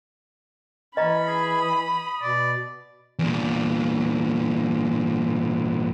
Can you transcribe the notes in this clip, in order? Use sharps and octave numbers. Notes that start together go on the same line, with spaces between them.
E3 C#4 D#5 A#5 B5
G#4
D#6
B2 D5
E2 A#2